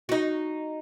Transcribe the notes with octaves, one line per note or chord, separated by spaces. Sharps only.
D#4 F#4